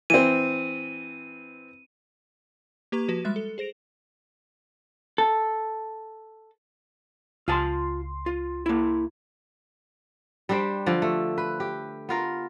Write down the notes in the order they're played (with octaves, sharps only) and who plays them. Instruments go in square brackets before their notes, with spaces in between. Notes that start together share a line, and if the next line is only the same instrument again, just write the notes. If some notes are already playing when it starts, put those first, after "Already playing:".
[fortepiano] E3 C4 [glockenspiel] D#7
[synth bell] A#3 G4 B4 A#5 C#6 G#6
F3 F#4 B4 B6
G3 G#3 E5 F#6 A6
A4
G#4 C5 A#6 D7 F7
[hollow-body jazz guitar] A4
[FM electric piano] C#2 C6 [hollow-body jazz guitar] F4 G#5 A5
[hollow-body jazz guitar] F4
A#3 E4
[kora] G3 D4 G4 C5
D3 F3 D5
A3
B4
G4
B3 F4 A#4